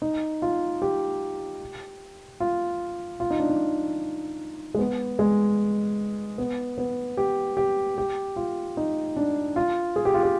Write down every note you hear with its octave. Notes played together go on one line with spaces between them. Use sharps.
D#4
F4
G4
F4
F4
D#4
D4
D#4
G#3
B3
G#3
B3
B3
G4
G4
G4
F4
D#4
D4
F4
G#4
G4
F4
G4